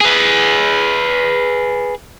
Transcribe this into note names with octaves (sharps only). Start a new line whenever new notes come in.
G#4 B4